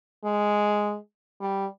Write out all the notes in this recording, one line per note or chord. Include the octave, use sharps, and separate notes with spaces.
G#3
G3